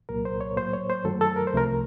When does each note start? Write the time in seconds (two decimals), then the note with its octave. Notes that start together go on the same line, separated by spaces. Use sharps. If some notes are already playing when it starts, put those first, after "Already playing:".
0.09 C2 A#2 F#3 A#3 A#4
0.25 C5
0.41 C#5
0.56 A2 F#3 A#3 C5
0.73 C#5
0.90 C5
1.04 F#2 D#3 F#3 A3 A4
1.21 A4
1.36 A#4
1.47 C5
1.53 C2 C3 F3 A3 A#4